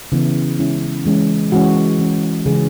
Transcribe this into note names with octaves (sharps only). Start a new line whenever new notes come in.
C#3 E3 B3 E4
E3 G#3 C#4 E4
E3 G#3 C#4
E3 G#3 C#4 F#4
E3 G#3 C#4
C#3 E3 G#3 C#4 G#4